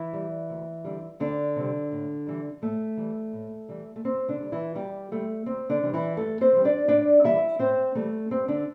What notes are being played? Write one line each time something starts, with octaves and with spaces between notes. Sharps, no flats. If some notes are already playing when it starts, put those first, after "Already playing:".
Already playing: E3 E4
G3
D2
D3 G3
D2 D3 D4
C3 G3
A2
E3 G3
A2 A3
E3 G3
A2
E3 G3
A3
D2 C4
D3 D4
D3 G3
E3 E4
D2 G3 G4
D3 G3 A3
D2 C4
D3 D4
C3 E3 G3
E3 E4
G2 A3 A4
C4 C5
E3 G3
D4 D5
A2 D4 D5
E3 G3 E4 E5
A2 C4 C5
E3 G3 A3
G2 C4
D3 D4